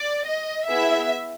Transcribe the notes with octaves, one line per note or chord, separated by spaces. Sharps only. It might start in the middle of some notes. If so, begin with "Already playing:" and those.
Already playing: D5
D#5
B3 E4 G#4 E5